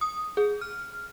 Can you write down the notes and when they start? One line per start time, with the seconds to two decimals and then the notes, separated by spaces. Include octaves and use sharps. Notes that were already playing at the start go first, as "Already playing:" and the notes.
0.01 D#6
0.37 G#4
0.61 F6